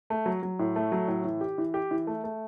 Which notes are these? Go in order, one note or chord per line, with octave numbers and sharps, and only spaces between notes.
A3
F#3
F#3
A2
A3
F#3
A2
E3
G4
E3
G4
E3
A3
A3